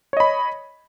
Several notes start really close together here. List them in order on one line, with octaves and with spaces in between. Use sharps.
C#5 D#5 B5